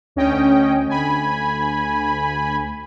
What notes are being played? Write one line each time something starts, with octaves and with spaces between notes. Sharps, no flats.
D2 C#4 D#5 G5
D2 G#5 B5